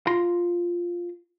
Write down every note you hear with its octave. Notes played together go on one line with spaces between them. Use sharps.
F4 A#5 C6